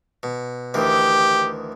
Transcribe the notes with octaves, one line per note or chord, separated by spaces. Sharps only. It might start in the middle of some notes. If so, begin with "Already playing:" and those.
B2
D2 D#3 E3 G4